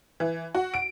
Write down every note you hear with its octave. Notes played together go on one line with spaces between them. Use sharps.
E3
F#4
D7